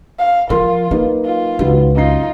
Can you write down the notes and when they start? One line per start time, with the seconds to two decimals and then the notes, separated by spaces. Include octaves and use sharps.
0.19 F5
0.50 F3 F4 A#4 C6
0.91 F#3 A#3 D#4 B4
1.25 F4
1.59 C#2 D#4 F#4 B4
1.96 F#2 D#4 F4 C7